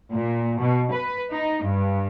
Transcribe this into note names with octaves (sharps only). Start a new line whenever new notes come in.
A#2
B2
B4
D#4
G2